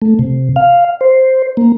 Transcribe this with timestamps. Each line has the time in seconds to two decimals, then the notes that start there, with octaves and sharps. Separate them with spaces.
0.02 A3
0.19 C3
0.56 F5
1.01 C5
1.57 A#3